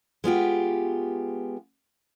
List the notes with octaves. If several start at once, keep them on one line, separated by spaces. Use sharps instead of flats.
G#3 B3 F4 G4